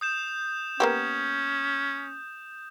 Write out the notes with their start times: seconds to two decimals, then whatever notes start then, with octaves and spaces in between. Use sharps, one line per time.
0.01 D#6 G6 E7
0.80 A#3 B3 C#4 G4